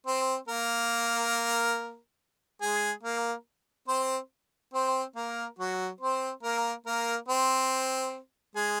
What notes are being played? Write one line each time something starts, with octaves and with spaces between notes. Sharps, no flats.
C4 C5
A#3 A#4
G#3 G#4
A#3 A#4
C4 C5
C4 C5
A#3 A#4
F#3 F#4
C4 C5
A#3 A#4
A#3 A#4
C4 C5
G#3 G#4